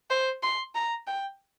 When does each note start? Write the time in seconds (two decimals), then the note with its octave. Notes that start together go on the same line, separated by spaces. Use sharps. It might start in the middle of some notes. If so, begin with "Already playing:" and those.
0.10 C5
0.43 C6
0.75 A#5
1.07 G5